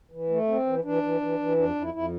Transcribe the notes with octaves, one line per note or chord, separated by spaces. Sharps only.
E3
A3
C4
E3
E3 D4
E3
E3
E3
F2 D4
F2
E4
F2 E4